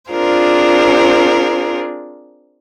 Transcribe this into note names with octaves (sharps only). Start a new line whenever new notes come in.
C4 D4 F4 G#4 A#4 C5